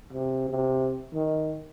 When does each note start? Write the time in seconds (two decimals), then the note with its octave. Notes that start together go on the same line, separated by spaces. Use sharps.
0.13 C3
0.50 C3
1.14 D#3